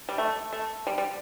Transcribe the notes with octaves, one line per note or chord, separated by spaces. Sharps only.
G3
A3
A3
G3
G3